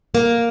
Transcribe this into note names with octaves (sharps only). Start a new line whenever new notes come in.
A#3